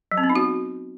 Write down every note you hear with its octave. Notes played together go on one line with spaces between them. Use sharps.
F#3
C4
B3
D#4
F#4